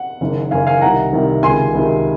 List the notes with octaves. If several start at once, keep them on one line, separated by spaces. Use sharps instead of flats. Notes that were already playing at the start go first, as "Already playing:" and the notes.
Already playing: F#5
F#1 F#2 D#3
F#1 F#2 D#3 F5 G#5
F5 G#5
C2 C3 D#3 F#5 A#5
C2 C3 D#3
C#2 C3 D#3 G#5 C6
C#2 C3 D#3